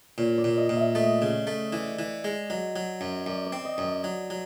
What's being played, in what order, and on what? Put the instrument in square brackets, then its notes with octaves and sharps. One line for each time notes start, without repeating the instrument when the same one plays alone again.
[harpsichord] A#2 [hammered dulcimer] C#5
[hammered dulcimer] D5
[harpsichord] A#2
[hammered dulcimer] D#5
[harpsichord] A#2
[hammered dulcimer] E5
[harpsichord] A3 [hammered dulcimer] D#5
[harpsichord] C#3
A3
[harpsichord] E3 [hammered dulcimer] D5
[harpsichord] E3
G#3
[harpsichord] F#3 [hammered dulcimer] D#5
[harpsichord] F#3
F#2
[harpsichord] F#2 [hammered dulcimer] D5
[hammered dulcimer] D5
[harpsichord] C4
[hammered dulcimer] D#5
[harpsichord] F#2 [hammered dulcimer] D#5
[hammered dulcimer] D5
[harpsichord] F#3
F#3